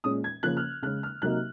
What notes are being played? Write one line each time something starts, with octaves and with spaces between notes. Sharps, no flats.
A#2 G#3 C#4 D#6
G#6
C#3 F3 A#3 C#4 F#6
F6
C#3 G#3 C#4 F#6
F6
C3 F#3 A#3 D#4 F#6